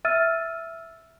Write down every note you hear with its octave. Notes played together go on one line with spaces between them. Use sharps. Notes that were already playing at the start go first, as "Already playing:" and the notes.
E5 E6 F6 A6 D#7